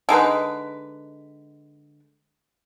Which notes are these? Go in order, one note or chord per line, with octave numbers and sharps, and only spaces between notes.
D3 G#3 D#4 B4